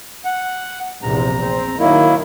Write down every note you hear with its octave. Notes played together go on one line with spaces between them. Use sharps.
F#5
A#1 E2 C3 A#5
C4
D#3 F#3 A#3 E4